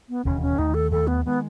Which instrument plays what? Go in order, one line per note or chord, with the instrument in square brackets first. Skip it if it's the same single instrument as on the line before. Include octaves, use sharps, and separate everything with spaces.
[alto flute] B3
[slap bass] E1 D#2 C#3 [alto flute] C#4
[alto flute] C#4
[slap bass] D#2 D#3 A3 [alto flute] D#4
[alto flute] A4
[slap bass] D#2 D#3 A3 [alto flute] A4
[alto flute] B3
[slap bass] D#3 G#3 [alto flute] B3